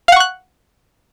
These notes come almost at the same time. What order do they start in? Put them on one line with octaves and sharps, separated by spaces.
F5 F#5 C#6 F#6